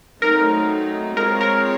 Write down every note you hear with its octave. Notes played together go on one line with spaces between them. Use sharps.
F#3 A3 C4 D#4 A#4
G#3 C4 F4 G#4 A#4 C#5
A#4